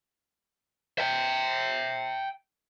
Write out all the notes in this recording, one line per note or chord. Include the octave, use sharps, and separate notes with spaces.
E5 G5